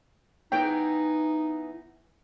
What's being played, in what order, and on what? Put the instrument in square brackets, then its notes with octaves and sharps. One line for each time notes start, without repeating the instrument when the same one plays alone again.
[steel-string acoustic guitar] E3 B3 G#4 [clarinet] D#4 [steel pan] G5